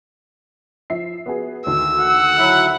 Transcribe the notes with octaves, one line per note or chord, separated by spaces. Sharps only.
F3 E5 C7
B3 F#4 G#4
D2 D#3 E6
F#5
F#3 E4 E5